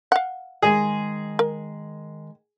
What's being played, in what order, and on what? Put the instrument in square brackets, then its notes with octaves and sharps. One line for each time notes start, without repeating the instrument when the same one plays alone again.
[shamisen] F5 F#5
[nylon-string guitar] D#3 G#3 G#5 [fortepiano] G#4
[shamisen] A#4